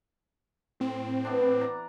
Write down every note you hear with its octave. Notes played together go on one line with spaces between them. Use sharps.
A2 C4
E3 B3 D4
D5 A#5